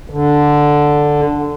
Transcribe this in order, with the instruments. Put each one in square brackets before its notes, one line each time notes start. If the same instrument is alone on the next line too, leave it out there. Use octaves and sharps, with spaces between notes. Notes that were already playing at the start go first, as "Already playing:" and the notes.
[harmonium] D3